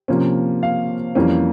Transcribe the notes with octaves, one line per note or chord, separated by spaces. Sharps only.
C3 F3 A#3 C#4
F5
F2 E3 G3 A#3 C#4